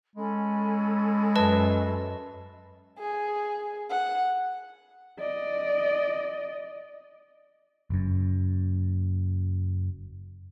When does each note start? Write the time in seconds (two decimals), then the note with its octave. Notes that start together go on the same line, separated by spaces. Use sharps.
0.16 G#3 C#4 A4 B5
1.36 F#2 B4 D#5 A5
2.99 G#4
3.90 F#5
5.19 D5 D#5
7.90 F#1 F#2